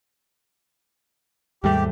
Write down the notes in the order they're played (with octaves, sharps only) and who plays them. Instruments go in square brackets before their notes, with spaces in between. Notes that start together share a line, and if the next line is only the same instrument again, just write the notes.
[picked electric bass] D#2 G#2 A3 [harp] G3 [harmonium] G4